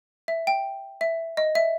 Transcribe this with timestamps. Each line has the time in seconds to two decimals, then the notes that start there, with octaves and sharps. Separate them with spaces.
0.28 E5
0.47 G5
1.01 E5
1.37 D#5
1.55 E5